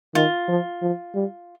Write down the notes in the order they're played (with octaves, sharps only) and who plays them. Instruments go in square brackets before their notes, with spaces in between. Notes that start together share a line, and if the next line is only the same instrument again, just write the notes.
[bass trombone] D#3 [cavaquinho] F4
[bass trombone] F3
F3
G3